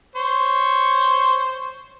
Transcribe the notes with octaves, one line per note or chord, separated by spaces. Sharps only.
C5 C#5